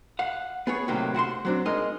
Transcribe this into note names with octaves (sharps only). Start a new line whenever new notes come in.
F5 F#5
B3 G#4 C#5
A2 C3 D#3 F#3 A#3
F#4 C5 F#5 C6
F#3 C4 D4
G#3 D#4 A#4 D#5